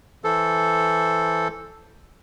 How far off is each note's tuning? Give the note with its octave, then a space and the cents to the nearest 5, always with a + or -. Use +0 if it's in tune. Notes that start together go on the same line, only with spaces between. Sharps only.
E3 +0 A4 +0 C5 +0